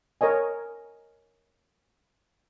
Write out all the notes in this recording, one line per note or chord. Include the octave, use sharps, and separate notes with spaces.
A#4 C#5 D#5 G#5